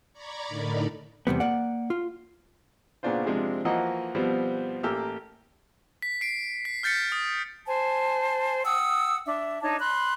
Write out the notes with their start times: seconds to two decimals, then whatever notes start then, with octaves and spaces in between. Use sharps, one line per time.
0.13 D5 A#5 B5 C#6 D6 G#6
0.48 A2 D3 D#4 A#4 D5 B5
1.27 E2 C3 G3 B3
1.40 A#3 D5 F#5
1.90 F4
3.03 A#2 C#3 B3 D4 F4 C5
3.26 C3 F3 G#3 C4 D4
3.65 E3 F3 A#3 F#4 D#5 F#5
4.15 B2 F3 G3 B3 C4
4.83 A1 A#3 G4 A4 E6 F6
6.02 B6
6.21 C7 D7
6.65 B6
6.83 F6 G6 A6 B6 C#7
7.12 D#6
7.66 C5 G#5 A5
8.65 F#5 G5 D#6 E6
9.27 D4 E5
9.61 D4 D#4 C#5 A5
9.79 B5 C6 F#6